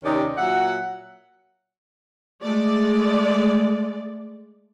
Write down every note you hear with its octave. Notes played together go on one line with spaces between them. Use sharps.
D#2 C3 D#3 C#4 D#4 D5
A#2 F#3 E5 F#5
G#3 A3 D5